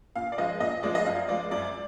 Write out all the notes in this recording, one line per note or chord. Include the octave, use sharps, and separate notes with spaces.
A#2 F5
D5
F3 G#3 D#5
A#2 D#5
F3 G#3 D5
D#5
F#2 F5
F3 G#3 D5
F#2 D5